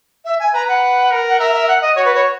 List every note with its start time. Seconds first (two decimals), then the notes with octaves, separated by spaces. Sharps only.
0.25 E5
0.40 G#5
0.54 B4 A#5
0.68 F#5
1.11 A#4
1.28 F#5
1.39 A#4 E5
1.53 E5
1.68 F#5
1.82 D#5
1.96 F#4 C#5
2.05 B4
2.15 C#5